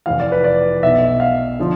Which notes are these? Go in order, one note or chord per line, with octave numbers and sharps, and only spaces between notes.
F1 F2 E3 F5
D5
B4
D5
B1 B2 E5
F5
D3 F3